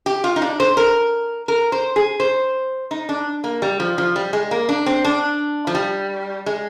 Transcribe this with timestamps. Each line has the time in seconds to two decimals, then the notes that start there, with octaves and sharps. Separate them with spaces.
0.06 G4
0.24 F4
0.36 D#4
0.42 D4
0.60 C5
0.77 A#4
1.48 A#4
1.72 C5
1.96 G#4
2.20 C5
2.91 D#4
3.09 D4
3.44 A#3
3.62 G3
3.80 F3
3.98 F3
4.16 G3
4.33 G#3
4.51 A#3
4.69 D4
4.86 C4
5.04 D4
5.67 F3
5.75 G3
6.46 G#3